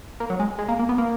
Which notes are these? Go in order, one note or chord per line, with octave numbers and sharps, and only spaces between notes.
A#3
F#3
G#3
G#3
A#3
A#3
B3
A#3